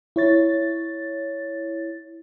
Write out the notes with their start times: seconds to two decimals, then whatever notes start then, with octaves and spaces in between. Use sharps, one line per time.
0.16 E4 C#5 A6